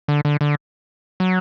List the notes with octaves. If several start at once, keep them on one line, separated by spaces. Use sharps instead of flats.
D3
D3
D3
F#3